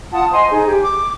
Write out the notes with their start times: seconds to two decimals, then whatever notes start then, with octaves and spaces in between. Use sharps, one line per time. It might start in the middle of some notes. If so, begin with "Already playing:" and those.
0.12 F4 F#5 A5 D#6
0.32 C5 D#5 G#5 C6
0.50 D#4 G#4 C5
0.67 G4
0.83 D6